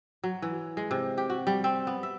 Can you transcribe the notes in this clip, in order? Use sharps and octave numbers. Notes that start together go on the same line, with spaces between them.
F#3
E3
G#3
C3
G4
F#4
G3
C4
B3
E5